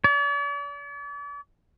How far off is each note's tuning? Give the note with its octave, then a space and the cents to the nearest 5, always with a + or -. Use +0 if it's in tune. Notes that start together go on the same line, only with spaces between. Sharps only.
D5 -45